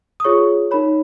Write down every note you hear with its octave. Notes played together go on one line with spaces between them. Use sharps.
D#6
F4 G#4 C#5 C#6
D#4 A#4 C#5 B5